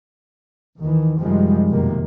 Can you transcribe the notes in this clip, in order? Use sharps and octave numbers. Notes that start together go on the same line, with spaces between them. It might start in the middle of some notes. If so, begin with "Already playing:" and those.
D#2 D#3 E3
F#2 C3 D#3 F3 G3 G#3
F1 B1 C3 D#3 A#3